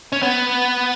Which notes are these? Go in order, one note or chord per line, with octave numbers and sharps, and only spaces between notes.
C#4
B3